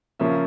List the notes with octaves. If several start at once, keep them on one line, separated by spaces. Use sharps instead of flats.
C#3 F3 A#3 C#4 E5